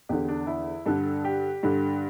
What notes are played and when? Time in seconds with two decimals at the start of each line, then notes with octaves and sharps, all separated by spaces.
0.09 E2 D3 G4
0.28 D4
0.47 E4
0.86 G2 D3 A4
1.25 G4
1.63 G2 D3